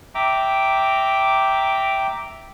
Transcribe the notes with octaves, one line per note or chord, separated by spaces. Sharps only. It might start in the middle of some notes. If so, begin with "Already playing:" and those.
E5 G5 A#5 D6